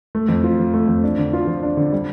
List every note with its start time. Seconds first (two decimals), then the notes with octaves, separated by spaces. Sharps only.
0.15 A3
0.28 F2
0.44 F4
0.59 F3
0.74 A3
0.88 F2
1.03 D4
1.18 D3
1.33 F4
1.47 F3
1.63 D4
1.77 D3
1.92 G3